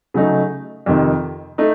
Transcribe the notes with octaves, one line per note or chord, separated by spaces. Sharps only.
C#3 F#3 A3 D#4
F2 C3 D#3
A3 D#4